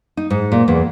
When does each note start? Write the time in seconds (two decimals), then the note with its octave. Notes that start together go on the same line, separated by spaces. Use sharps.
0.17 D#4
0.30 G#2
0.52 A#2
0.68 E2